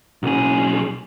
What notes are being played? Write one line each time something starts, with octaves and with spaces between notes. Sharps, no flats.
F#1 B1 G#4